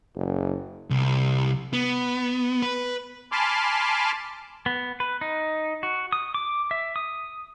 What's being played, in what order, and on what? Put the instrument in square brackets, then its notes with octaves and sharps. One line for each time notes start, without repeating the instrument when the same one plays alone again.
[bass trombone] F#1
[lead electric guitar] C2
B3
B4
[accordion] G#5 A5 B5 C6 D6 F6
[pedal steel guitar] B3
B4
D#4
F#4
D#6
D6
E5
D#6